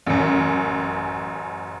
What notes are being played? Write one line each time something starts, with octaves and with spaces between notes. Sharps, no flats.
A1 F#2